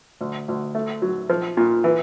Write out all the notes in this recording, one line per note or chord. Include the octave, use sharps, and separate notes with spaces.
D2
D2
A3
F#3
F3
A#2
E3